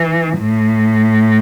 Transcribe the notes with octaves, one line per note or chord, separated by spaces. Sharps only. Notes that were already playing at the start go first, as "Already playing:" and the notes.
Already playing: E3
A2